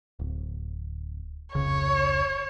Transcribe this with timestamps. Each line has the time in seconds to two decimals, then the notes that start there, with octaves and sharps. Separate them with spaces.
0.19 D1
1.55 F1 C#2 C#3 C#5